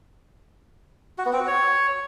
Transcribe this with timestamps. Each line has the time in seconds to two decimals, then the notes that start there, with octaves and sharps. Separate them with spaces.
1.18 F#4
1.26 B3
1.33 C4
1.40 F#4
1.47 C#5